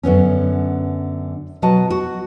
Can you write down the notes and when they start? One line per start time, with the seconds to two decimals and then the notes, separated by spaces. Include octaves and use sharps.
0.03 F#2 D3 B3 C#4
1.62 B2 F#3 F#4 D#5 A5
1.90 F#4